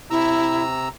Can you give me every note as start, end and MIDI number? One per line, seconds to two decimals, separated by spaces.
0.11 0.88 48
0.11 0.64 64
0.11 0.88 82
0.11 0.88 88